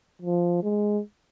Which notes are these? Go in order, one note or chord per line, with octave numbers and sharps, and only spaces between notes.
F3
G#3